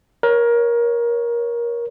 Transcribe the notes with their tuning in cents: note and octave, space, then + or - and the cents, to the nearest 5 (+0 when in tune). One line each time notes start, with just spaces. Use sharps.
A#4 +20 C#5 +0